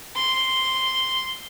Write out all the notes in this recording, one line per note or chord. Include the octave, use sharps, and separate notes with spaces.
C6